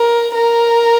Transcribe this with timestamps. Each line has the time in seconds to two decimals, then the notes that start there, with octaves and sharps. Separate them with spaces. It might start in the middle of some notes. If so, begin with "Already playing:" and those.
Already playing: A#4
0.35 A#4